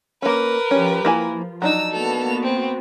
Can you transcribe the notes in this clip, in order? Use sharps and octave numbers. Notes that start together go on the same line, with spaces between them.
A#3 C#4 A#4 B4
F3 C#4 G4
F3 A#3 E4 G#5
F#3 D4 D#4 A#5 E6
A#3 B3 F#4 A4 F7
C4